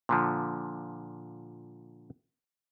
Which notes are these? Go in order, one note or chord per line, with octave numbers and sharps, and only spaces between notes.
A#2 D3 F3